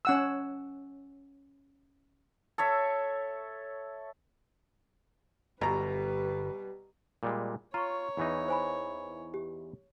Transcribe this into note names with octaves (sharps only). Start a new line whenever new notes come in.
C#4 F#5 E6
A4 C#5 E5
G1 B2 G3 B4 A#5
A#2 G3 G#3
F4 C#5 A#5 C#6
E2 E3 D#4
C5 G#5 B5
G4